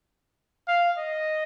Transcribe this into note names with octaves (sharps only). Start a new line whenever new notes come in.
F5
D#5